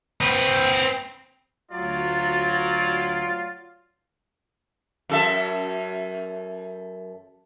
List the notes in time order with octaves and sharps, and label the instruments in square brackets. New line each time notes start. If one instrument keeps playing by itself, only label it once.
[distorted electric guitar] C4 B4
[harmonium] D2 [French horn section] F#3 [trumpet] F4 [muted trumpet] D5
[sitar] F#2 A4 E5